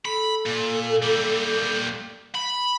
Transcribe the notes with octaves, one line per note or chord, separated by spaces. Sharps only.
A4 B5
A#2
G3 A#3
B5